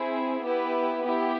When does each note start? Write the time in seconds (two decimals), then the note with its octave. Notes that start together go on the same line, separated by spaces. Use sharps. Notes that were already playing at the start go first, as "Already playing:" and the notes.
Already playing: C4 E4 G#4
0.44 B3 E4 G4 B4
1.02 B3 E4 G4